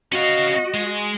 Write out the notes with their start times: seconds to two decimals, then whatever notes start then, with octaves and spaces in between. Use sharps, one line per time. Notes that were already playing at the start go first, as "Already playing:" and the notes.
0.12 C#4 F#4 D#5 F5
0.74 G#3